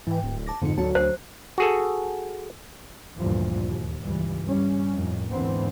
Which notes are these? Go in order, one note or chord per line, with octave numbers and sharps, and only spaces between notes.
G#2 E3 G5
D1
A5 D6 A#6
F2 G#2 D3 C#7
D2 F#3 A5 C#7
D2 C5 C7
F#4 G#4 A4
D2 G2 A#2 E3 F3
D#2
C#2 G2 E3 G3
G2 G3 C#4
F2 A2 D#3
D#2 G#2 D3 E3 B3 C4